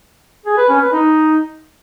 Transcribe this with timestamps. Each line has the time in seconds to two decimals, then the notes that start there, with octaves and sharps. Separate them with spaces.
0.46 G#4
0.58 B4
0.69 C#4
0.81 B4
0.93 D#4